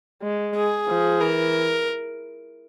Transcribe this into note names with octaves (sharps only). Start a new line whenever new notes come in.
G#3
G#4
F3
E3 A#4